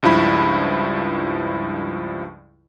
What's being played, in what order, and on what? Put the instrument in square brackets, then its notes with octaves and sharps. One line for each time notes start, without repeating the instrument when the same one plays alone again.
[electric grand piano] C#2 G2 F3 E4 B5